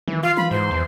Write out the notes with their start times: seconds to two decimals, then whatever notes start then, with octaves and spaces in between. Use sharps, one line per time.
0.08 D#3 E3
0.23 F4 F5
0.37 E3 B5
0.51 G#2 C5
0.71 E2